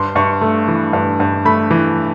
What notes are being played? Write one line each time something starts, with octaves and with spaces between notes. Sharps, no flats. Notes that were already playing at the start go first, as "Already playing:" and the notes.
Already playing: G2 C6
G2 C#6
A3
E3
G2
G2
A3 B5
E3